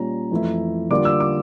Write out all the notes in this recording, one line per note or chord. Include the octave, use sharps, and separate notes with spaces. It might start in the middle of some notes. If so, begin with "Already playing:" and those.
Already playing: A#2 G3 C#4 A#5
F2 E3 A3 E4
D3 G3 A#3 D4 F4 D6
E6
D6